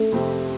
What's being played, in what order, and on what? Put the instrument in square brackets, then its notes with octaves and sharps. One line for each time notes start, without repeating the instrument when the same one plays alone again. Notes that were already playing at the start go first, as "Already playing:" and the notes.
Already playing: [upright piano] A3
[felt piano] F2 C3 F3 C4 G4